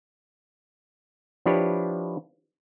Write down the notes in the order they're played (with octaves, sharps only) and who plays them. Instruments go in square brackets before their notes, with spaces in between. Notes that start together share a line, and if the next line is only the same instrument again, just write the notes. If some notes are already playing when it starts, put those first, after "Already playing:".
[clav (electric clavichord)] F3 D4 E4 G4 B4 C#5